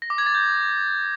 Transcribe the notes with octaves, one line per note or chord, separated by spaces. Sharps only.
A#6
D6
G#6
A6
G6